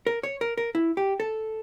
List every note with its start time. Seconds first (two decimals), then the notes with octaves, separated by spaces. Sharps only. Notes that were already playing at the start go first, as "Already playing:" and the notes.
0.07 A#4
0.23 C#5
0.41 A#4
0.58 A#4
0.75 E4
0.97 G4
1.20 A4